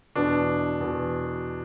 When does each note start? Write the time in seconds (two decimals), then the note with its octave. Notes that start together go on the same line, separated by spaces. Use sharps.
0.16 E2 B2 D4
0.81 E2 B2